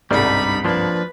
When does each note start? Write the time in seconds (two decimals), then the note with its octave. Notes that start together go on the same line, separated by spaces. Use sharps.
0.11 G1 C2 G#2 G3 D4 D#4 B5
0.65 F3 A#3 D4 B4